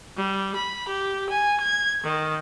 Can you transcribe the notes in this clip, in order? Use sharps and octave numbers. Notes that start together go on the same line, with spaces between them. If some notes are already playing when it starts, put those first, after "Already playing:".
G3
B5
G4
G#5
G#6
D#3